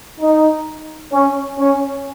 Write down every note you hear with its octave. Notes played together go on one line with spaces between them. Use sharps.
D#4
C#4
C#4